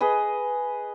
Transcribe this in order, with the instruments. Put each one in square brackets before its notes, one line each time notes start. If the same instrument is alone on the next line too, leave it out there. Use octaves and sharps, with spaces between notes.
[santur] G#4 B4 D#5